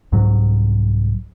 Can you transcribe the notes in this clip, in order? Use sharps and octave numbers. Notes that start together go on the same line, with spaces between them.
C2 G#2 F#3